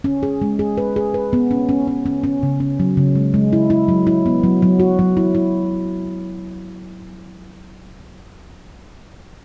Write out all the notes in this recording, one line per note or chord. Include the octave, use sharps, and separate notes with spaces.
C#4
G#4
G#3
G#4
B4
G#4
B4
B3
C#4
C#4
C#4
C#4
C#4
C#3
C#4
F#3
C#3
G#3
G#3
E4
E4
F#3
E4
B3
F#3
F#3
F#4
F#3
E4
E4